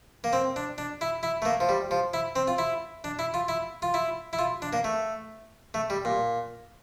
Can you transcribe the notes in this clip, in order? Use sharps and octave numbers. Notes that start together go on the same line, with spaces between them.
A#3
C4
D4
D4
E4
E4
A3
A#3
F3
G3
F3
E4
C4
F4
E4
D4
E4
F4
E4
F4
E4
E4
F4
D4
A#3
A3
A3
G3
A#2